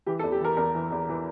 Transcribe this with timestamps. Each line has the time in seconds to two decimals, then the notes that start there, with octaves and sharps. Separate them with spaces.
0.06 E3 G4
0.19 A4
0.23 E2
0.32 G4
0.41 E3 A#4
0.57 E2 A#4
0.75 E3
0.92 E2
1.09 E3